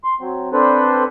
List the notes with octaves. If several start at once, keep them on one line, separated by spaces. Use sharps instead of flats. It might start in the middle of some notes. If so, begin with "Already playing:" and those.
C6
F#3 C4
C4 D4 A4 B4 C5